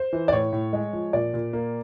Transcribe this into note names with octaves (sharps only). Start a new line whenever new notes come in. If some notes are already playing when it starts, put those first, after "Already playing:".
Already playing: C5
E3
D5
A2 C#5
A2
G#3
F3
A#2 D5
A#2
A#3